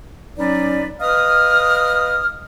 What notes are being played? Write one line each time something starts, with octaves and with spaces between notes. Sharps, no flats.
F#3 C#4 D#4 B4 D5
B4 D#5 F5 D#6 F6